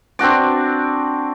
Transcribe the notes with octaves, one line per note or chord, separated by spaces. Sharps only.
C4 D4 F#4 D5